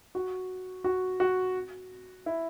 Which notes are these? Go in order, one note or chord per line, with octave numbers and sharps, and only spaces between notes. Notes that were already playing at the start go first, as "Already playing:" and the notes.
F#4
F#4
F#4
E4